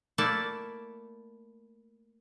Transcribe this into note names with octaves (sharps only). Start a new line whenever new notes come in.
A3 A#3 E4 D5